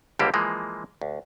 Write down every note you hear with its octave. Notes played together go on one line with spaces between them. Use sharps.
C#2 D3 G3 A#3 G4 C5
E3 F3 G#3 A#3
D2